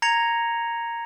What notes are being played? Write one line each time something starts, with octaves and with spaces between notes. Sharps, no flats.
A#5 G#6 A#6 C#7 F7